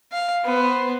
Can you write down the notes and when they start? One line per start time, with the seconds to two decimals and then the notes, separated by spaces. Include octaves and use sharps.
0.12 F5
0.44 B3 C5